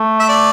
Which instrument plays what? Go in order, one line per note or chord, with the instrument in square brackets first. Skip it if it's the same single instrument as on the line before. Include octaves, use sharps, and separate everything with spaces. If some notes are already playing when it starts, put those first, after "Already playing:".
Already playing: [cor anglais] A3
[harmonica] E5
D5